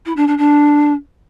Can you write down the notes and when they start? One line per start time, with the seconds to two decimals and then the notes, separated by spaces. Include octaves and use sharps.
0.06 E4
0.16 D4
0.27 D4
0.38 D4